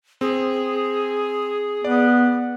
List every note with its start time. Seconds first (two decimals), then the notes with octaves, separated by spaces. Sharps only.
0.21 C4 G#4
1.85 B3 D5